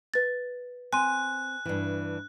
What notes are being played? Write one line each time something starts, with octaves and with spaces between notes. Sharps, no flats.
B4 A6
C4 G#5 C6 F#6 D#7
G2 E3